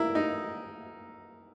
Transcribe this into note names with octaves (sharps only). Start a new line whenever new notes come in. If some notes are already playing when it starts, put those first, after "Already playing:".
Already playing: E4 A#4
D#4